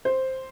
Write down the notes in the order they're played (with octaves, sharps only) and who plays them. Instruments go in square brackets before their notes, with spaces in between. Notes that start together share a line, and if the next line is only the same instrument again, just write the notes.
[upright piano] C5